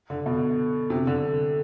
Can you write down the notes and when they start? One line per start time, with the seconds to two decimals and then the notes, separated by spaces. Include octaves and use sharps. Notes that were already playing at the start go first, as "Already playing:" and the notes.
0.10 D3
0.26 B2
0.90 C3
1.07 D3